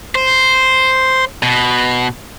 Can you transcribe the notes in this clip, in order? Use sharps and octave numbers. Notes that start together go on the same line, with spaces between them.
C5
B2